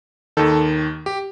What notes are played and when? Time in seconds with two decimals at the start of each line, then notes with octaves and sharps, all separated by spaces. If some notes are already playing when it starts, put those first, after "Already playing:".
0.37 D#2 D#3 A4
1.06 G4